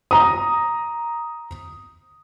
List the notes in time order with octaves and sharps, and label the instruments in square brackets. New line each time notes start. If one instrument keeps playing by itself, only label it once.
[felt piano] A#5 D#6